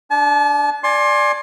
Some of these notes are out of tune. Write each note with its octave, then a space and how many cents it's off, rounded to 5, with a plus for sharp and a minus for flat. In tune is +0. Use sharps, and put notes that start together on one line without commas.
D4 +0 A5 -40
D5 +5 G#5 +0 C6 +30